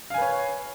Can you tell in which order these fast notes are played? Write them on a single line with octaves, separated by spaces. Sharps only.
F5 G#5 B4 C#5